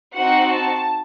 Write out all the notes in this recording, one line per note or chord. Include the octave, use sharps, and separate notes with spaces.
C4 D#4 F#4 F#5
A5